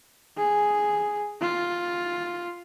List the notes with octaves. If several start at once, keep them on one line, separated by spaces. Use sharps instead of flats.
G#4
F4